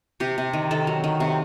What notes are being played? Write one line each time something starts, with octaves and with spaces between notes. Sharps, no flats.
C3 G4
C3
D#3
D#3 A4
F#3
D#3
C3